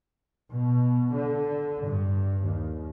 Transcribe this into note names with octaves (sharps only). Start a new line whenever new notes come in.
B2
D3
G2
D#2